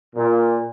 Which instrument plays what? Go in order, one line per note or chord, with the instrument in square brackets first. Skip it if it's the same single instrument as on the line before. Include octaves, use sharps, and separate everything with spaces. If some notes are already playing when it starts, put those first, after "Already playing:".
[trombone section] A#2